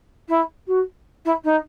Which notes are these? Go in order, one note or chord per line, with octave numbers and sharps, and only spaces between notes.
E4
F#4
E4
D#4